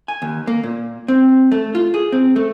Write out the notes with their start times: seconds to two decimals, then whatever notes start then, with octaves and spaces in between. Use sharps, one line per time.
0.08 G#5
0.22 D#2
0.47 A#3
0.63 A#2
1.08 C4
1.52 A3
1.75 F4
1.94 G#4
2.12 C4
2.36 A3